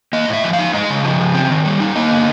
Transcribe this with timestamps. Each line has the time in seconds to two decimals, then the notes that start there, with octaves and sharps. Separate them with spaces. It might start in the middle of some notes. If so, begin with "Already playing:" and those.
0.13 A#3 D#5
0.28 A2
0.33 E5
0.44 F3
0.53 F5
0.59 D#4
0.73 G#3 D#5
0.90 C#3
1.05 F3
1.20 C#3
1.34 C4
1.50 D#3
1.65 G3
1.80 D#4
1.96 A#3 D#5
2.11 D3